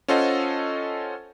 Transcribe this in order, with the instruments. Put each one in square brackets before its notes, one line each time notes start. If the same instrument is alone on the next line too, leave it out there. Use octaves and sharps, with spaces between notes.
[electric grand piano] C#4 F4 A4 C5 D#5 F#5